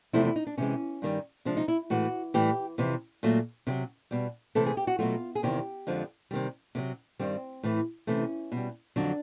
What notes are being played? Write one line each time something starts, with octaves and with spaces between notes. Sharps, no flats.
E2 C3 F3 A3 E4
E4
D#4
D4
C3 E3 G#3 C#4
G2 D#3 G3
C3 F3 G#3 D4
D#4
E4
A2 E3 G#3 F#4
A2 E3 G3 G4
F2 C3 E3
A#2 F#3 A3
C3 D#3 F#3
B2 G3
C3 E3 A3 A4
G#4
G4
F#4
B2 F#3 A3 F4
G#4
E2 C3 D#3 G4
F2 D3 F3 G#3
C3 D#3 G3
C3 D#3 F#3
G2 D#3 G3 C4
A2 E3 A3
C3 E3 A3 C#4
B2
G3
F2 D3 F#3 D4